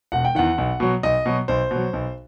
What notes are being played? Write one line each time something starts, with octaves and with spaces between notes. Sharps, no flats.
E1 F#5
G5
E2 D#3 F#5
B1
B2 F#3
B1 D#5
B2 F#3
B1 C5
B2
F#3
B1